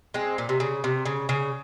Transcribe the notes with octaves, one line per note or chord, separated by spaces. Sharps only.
G#3 C4
A#2
C3
C#3
C3
C#3
C#3